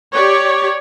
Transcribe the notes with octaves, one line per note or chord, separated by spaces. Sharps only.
G4 C#5 D5